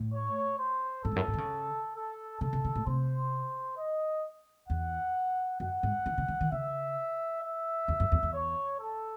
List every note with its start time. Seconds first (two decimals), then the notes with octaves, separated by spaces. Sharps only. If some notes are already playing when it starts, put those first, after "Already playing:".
Already playing: A2
0.13 C#5
0.58 C5
1.04 G#2 A4
1.12 E2
1.16 F#2
1.28 G#2
1.34 D#3
1.38 C#3
1.95 A4
2.41 C#3 A4
2.53 C3
2.65 C#3
2.75 A2
2.87 C3 C5
3.78 D#5
4.69 E2 F#5
5.60 F#2 F#5
5.83 G#2
6.06 D#3
6.18 C#3
6.28 E3
6.41 D#3
6.52 C#3 E5
7.43 E5
7.88 E2
8.00 F#2
8.12 E2
8.23 E2
8.34 C#5
8.80 A4